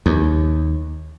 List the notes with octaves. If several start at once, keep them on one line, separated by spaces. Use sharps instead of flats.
D#2